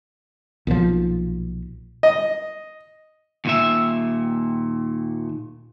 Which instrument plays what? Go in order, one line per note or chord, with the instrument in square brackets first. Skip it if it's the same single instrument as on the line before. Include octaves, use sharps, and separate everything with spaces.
[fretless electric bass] B1 A#2 E3 F3
[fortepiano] D#5
[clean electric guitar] D#2 A#2 E5